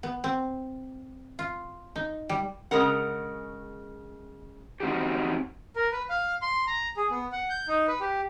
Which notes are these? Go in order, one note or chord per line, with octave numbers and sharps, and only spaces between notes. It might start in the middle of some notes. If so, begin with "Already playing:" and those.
B3
C4
F4
D#4
G3
C#3 G#3 A#4 F#5
C4 C#4 D#4 F#4 G4
A#4
B4
F5
C6
A#5
G#4
B3
F#5
G6
D#4
B4
G4